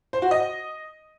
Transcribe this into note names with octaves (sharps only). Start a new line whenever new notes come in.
C5
F#4
D#5